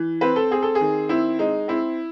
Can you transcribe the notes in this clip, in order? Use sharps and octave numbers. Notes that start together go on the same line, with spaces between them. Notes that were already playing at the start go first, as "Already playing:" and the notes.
Already playing: E3
C4 B4
A4
C4 G#4
A4
G#4
D#3
C4 E4
G#3 D#4
C4 E4